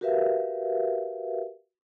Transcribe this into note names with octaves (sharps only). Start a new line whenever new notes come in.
F#4 G4 A#4 B4 E5 F5